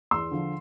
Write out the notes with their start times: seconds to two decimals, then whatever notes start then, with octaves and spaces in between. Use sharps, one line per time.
0.11 E2 C6 E6
0.31 D3 F3